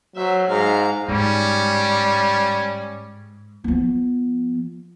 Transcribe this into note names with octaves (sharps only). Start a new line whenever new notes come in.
F#3 C5 E5
G#2 F5 A#5
G#2 G3 C#4
F3 B3